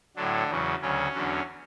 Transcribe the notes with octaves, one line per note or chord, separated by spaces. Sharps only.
A2 D3 F#3 D4
E2 C#3 F#3
D2 C#3 F#3 C#4
E2 D3 F#3